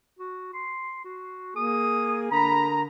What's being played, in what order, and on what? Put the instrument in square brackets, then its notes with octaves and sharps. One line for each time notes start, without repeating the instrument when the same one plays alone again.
[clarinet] F#4
C6
F#4
[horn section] A#3 G#4 [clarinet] D#6
[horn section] D3 A#4 A#5 [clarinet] B5